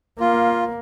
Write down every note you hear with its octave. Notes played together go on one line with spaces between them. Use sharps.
A#3 F4